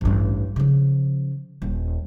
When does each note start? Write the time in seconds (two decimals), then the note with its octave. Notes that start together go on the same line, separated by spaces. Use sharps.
0.01 A1 G2
0.56 C#3 F3
1.62 D#1